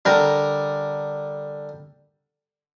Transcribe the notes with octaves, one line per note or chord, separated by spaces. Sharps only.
D3 G3 A#4